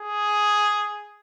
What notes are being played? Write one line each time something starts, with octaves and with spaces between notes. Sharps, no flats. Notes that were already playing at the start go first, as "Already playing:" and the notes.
Already playing: G#4